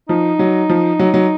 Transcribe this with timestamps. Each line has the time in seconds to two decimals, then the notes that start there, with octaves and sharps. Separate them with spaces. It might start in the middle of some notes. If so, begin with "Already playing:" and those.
0.09 F3 D#4
0.39 F#3
0.69 F3
0.99 F#3
1.14 F#3